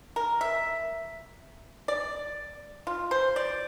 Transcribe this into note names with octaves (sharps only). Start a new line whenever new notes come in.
A#4
E5
D5
F4
C5
D5